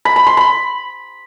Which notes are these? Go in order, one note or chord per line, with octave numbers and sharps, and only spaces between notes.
B5
B5
C6
B5